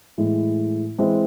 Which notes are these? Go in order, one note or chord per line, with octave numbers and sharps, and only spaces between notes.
A2 E3 G#3
E3 G#3 C4 E4